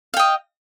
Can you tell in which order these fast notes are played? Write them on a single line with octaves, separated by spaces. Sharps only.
F5 G5 D#5